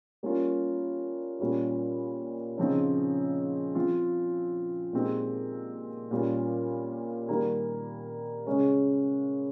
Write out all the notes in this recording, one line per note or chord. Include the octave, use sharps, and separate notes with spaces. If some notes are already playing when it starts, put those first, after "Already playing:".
G3 A#3 C#4 F4
A#2 G3 C#4 F4
C#3 F3 C4 D#4
F3 C4 F4
A#2 G#3 C4 D#4 G4
A#2 G3 C#4 F4
D#3 G3 A#3
C#3 G#3 C#4